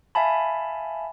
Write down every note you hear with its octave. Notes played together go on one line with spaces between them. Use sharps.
E5 F5 G#5 A5 B5